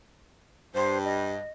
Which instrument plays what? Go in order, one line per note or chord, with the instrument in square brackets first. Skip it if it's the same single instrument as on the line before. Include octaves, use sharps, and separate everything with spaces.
[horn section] G2 [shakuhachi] C5
[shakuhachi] D#5